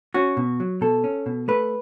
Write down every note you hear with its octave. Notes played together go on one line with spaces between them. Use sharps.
C#4 F#4
B2
F#3
B2 A4
C#4
B2
A3 B4